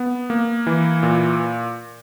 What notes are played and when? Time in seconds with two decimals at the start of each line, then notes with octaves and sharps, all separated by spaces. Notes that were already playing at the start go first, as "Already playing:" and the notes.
Already playing: B3
0.30 A#3
0.67 E3
1.03 A#2